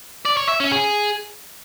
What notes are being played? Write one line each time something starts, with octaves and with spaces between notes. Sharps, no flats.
D5
C#5
E5
C#4
G#4